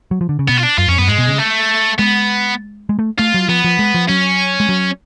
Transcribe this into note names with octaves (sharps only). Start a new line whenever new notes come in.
F#3
F3
D3
C#3
B2 B3
F4
D4
F#2 F4
F2 C#4
F#2 B3
G#2 G#3
B2
C#3
A3
G#3 B3
G#3
A3
A3 F4
F#3
F3 B3
F3
G#3
F3
F#3 C#4
G#3
F#3